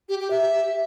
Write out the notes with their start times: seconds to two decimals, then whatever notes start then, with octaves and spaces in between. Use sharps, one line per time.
0.09 G4
0.20 G4
0.31 E5